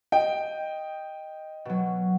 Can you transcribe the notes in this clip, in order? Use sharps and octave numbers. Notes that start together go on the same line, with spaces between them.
D#5 G5
B2 F#3